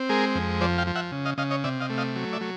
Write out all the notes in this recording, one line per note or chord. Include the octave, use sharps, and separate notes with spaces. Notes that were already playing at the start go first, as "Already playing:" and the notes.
Already playing: C4
G#3 G#4 A#4
F2
F3 C5 D5
F5 G5
F3
E5 F#5
C#3
D#5 F5
C#3 D#5 F5
C#5 D#5
C3 D5 E5
D#5 F5
A3
D#5 F5
F#3
D5 E5
F#3